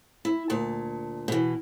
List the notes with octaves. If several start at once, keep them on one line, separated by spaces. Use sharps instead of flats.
E4
D2 A#2 A5
B2 E3